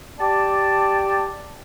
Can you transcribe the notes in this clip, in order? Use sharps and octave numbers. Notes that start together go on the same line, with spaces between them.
G4 D5 A5